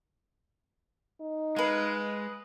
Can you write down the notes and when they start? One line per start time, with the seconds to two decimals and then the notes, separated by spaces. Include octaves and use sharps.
1.21 D#4
1.56 G#3 B4 F5